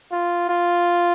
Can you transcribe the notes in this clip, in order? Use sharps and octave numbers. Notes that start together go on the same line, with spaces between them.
F4
F4